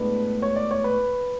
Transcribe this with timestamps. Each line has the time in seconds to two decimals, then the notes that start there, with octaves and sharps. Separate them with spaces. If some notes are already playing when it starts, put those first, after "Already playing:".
Already playing: A2 G#3 B3 D4 B4
0.42 C#5
0.56 D5
0.71 C#5
0.84 B4